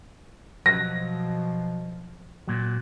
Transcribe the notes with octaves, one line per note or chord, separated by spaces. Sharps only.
B2 F3 F#3 A#6
A#2 F#3